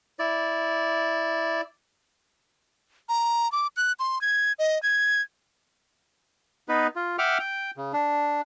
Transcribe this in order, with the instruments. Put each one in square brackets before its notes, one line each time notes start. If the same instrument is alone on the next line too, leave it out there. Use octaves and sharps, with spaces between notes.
[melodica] E4 D5
[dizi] A#5
D6
F#6
C6
G#6
D#5
G#6
[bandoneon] B3 D#4 B4
F4
E5 F#5 G5 D6 F6
G5
C#3
D4